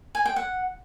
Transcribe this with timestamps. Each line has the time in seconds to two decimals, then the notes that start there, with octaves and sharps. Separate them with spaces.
0.15 G#5
0.26 G5
0.36 F#5